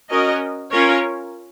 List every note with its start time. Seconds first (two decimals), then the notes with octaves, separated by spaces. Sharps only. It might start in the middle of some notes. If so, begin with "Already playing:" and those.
0.09 C#4 F#4 A#4 D#5
0.71 C#4 F4 A#4 C#5